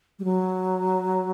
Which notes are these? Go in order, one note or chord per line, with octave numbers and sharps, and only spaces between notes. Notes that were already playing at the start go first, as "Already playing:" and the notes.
G3
F#3